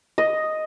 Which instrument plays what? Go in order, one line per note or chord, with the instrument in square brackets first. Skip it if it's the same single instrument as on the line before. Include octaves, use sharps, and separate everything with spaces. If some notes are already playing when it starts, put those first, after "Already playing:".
[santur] D#5